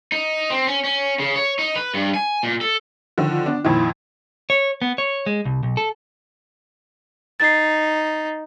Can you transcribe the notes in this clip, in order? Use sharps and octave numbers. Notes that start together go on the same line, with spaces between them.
D#4
C4
C#4
C#4
C#3
C#5
D#4
B4
G2
G#5
A#2
A4
D3 D#3 F3
F4
B3 D4
F2 A#2 D#3 E4
C#5
B3
C#5
G#3
C2
B1
A4
D#4 A6 C7